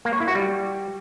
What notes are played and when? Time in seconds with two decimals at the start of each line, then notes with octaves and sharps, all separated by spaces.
0.05 A#3
0.13 C#5
0.20 E4
0.28 F#4
0.35 G3